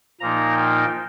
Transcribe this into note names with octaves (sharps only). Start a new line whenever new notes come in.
A#2 F3 A#3 D#4 A#5
G5